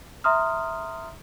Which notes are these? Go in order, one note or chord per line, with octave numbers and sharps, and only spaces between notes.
E5 A#5 C6 D#6 F6